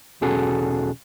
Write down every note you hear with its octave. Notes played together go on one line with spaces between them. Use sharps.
B1 E2 C#4 F#4 G#4 A4